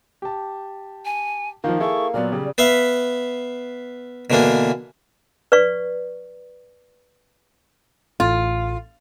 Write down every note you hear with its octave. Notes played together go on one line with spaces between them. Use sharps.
G4 A5
G#5
D#3 F3 A#3 F4
E4 G#4 A4 C#6
A#2 F#3 B3 D5
C#3 G3
B3 B4 E5 F5
B2 D3 E3 A#3 D4
B4 D5 F5 C#6
A1 A2 A3 F4